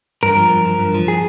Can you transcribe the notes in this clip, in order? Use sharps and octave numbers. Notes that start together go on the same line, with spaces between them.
G2 A#4
F3
G2
F3
G2
F3
G#4